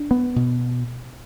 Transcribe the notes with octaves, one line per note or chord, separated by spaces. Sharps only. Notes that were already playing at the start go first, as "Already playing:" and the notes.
Already playing: D4
B3
B2